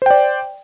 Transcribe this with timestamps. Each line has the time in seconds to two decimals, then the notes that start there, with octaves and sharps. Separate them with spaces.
0.02 C5
0.06 G5
0.10 D5